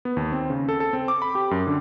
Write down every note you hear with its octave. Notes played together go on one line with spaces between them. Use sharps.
B3
D#2
C4
C#3
A4
A4
C4
D6
B5
G4
F#2
D3